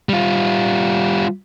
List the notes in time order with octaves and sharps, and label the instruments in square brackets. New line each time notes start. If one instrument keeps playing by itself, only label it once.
[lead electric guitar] G3 F4